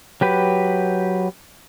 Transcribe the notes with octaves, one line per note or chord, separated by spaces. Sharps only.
F#3 G4 B4